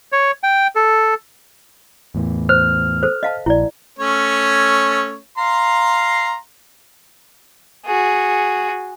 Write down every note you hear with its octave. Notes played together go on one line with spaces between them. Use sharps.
C#5
G5
A4
E2 A2 E3
C5 F6
A4 C5
D#5 F5 A5
A#1 E4 D5
A3 C#4 C#5
F5 A#5 C6
F#4 G#4